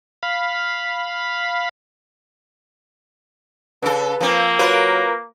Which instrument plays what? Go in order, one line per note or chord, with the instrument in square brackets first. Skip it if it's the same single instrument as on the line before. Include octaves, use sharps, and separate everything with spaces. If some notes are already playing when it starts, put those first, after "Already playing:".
[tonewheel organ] F5 B5
[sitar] C#3 A4 [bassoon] B4
[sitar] F3 C4 [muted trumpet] A#3
[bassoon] F#3 [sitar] F4 A#4 B4